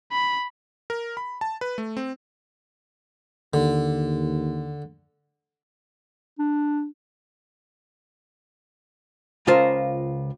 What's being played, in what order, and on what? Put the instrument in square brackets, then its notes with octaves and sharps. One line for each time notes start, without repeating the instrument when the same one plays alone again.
[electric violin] B5
[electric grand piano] A#4
B5
A5
B4
A3
C4
[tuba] D#2 [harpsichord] D3
[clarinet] D4
[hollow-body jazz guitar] C#2 C#3 F4 A#4 C5 A5